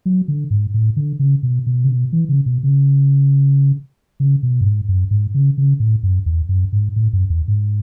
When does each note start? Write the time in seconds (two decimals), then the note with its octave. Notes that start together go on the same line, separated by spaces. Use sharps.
0.06 F#3
0.28 D3
0.50 G#2
0.74 A2
0.96 D3
1.19 C#3
1.43 B2
1.66 B2
1.84 C#3
1.89 B2
2.13 E3
2.29 C#3
2.46 B2
2.63 C#3
4.20 C#3
4.43 B2
4.61 F#2
4.65 G#2
4.88 F#2
5.11 G#2
5.34 C#3
5.58 C#3
5.80 A2
6.03 F#2
6.26 E2
6.49 F#2
6.72 G#2
6.96 A2
7.13 F#2
7.30 E2
7.48 G#2